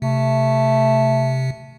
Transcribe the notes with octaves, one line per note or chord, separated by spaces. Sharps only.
C3 A3